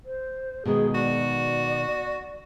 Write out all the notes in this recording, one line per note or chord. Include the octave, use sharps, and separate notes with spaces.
C5
B2 D#3 G#3 G#4
F#4 D5